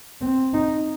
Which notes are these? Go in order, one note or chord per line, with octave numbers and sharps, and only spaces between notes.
C4
D#4